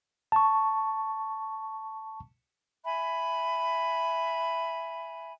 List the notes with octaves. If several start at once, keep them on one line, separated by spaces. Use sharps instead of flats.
A5 C#6
E5 G#5 B5